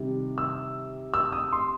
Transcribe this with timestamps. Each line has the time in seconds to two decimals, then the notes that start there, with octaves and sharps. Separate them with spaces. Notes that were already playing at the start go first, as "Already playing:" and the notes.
Already playing: C3 D#3 G3
0.38 E6
1.14 E6
1.32 D#6
1.52 C6